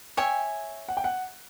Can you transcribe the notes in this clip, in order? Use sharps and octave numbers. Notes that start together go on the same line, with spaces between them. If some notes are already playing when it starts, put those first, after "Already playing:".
C#5 E5 G5 G#5
F#5
G5
F#5